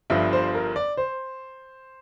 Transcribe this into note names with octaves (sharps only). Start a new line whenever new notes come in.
G1 G2 F3 E5
C5
A#4
D5
C5